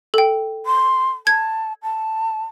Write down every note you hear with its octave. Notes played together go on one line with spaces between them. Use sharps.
A4 G5
C6
A5 G#6
A5